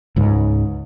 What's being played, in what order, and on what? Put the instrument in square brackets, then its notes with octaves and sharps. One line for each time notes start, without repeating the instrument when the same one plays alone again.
[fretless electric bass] C#2 G#2